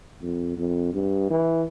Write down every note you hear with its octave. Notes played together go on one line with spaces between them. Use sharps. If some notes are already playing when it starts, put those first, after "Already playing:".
F2
F2
G2
E3